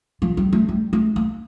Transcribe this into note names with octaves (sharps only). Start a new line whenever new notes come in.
F3
G3
A3
G3
A3
A#3